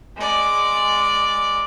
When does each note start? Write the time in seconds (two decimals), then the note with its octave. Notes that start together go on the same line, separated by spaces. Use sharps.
0.17 G#3 D5